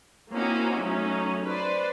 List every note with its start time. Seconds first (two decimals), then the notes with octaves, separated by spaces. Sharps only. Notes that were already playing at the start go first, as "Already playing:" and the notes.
0.32 A#3 C4 C#4 D#4 E4 F#4
0.81 F#3 A3 C#4 D#4
1.45 B4 C5 D5